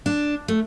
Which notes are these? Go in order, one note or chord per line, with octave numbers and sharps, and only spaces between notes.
D4
A3